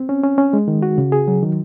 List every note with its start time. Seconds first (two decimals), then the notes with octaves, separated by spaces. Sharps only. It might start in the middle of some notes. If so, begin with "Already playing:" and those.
Already playing: C4
0.09 C#4
0.23 C#4
0.38 C#4
0.53 G#3
0.68 D#3
0.83 F#4
0.98 C#3
1.12 G#4
1.28 F#3
1.43 D#3